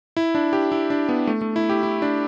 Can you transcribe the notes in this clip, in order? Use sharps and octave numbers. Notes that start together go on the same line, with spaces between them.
E4
D4
G4
E4
D4
B3
A3
A3
E4
G4
E4
D4